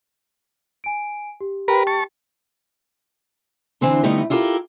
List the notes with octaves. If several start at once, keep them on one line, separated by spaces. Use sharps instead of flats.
G#5 D7
G4
G4 A#4 B4 G5
A5 C#6
D3 E3 C4 D4
D3 G3 A3 B3 D#4
E4 F4 G4 A4 A#4